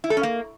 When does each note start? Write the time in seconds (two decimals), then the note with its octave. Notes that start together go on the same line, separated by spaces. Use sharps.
0.04 E4
0.10 A4
0.17 C#4
0.23 A#3